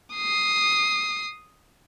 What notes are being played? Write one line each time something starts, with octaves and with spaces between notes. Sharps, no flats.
D#6 C7